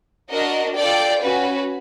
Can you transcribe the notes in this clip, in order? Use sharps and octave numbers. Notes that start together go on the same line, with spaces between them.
D4 F#4 A#4 D#5
F4 A4 D5 G5
C#4 F#4 B4